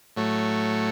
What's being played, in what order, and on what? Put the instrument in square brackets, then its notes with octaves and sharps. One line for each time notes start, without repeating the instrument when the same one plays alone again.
[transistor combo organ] A2 F#3 A3 C#5